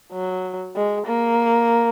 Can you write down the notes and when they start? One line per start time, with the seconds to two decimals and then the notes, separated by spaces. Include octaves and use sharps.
0.12 F#3
0.76 G#3
1.06 A#3